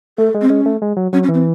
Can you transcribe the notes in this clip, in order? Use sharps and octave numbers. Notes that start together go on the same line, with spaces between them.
A3 A4
G#3
C4
G#3 C#4
A3
G#3
F#3
F#3 C#4
C#4
E3
C4